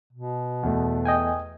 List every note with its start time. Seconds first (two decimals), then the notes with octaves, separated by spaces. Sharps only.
0.13 B2
0.63 E2 A3
1.05 D#5 G5 G#5